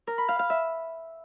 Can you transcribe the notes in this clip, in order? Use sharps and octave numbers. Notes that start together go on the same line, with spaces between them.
A#4
B5
F5
F5
E5